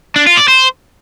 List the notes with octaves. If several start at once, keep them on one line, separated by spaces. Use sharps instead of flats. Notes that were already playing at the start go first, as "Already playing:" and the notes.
D4
F4
D5
C5